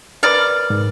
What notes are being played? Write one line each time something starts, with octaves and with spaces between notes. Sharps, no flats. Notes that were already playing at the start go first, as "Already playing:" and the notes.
A#4 B4 D5 F6
G#2